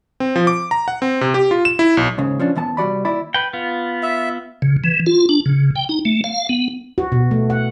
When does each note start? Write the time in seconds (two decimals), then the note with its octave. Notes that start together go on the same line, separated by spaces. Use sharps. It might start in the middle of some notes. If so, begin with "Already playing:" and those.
0.20 C4
0.36 F3
0.47 D6
0.71 A#5
0.88 F#5
1.02 C4
1.21 C3
1.34 G4
1.51 F4
1.65 E7
1.79 E4
1.97 B1
2.18 D#2 G#2 C#3
2.39 F3 C#4 D4
2.56 D#2 E3 B3 A5
2.77 C2 G3 F#4 D5 B5
3.05 D#2 E4 D5 B5
3.34 B4 G5
3.53 B3 F4
4.03 E5
4.62 C#3
4.84 E3
5.06 F4
5.29 D4
5.46 C#3
5.76 G5
5.89 D#4
6.05 A3
6.24 F5
6.49 B3
6.98 F#4
7.12 B2
7.31 A3
7.50 F#5